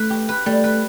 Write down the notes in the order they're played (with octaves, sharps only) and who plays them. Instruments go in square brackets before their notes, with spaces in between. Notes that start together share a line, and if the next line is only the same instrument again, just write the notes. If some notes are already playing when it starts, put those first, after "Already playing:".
Already playing: [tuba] A3 [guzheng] B4
[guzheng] G4
B4
[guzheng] G3 [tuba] A3
[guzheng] B4